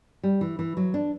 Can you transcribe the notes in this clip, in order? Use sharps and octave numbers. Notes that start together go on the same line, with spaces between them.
G3
E3
E3
F#3
D4